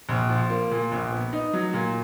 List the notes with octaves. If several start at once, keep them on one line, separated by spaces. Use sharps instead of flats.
A#1
F3
A#3
A#2
A#1
B3
D#4
F#3
A#2